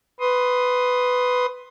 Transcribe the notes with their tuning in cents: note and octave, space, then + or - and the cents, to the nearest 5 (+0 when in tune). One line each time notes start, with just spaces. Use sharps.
B4 +10 C6 +10 D#6 +0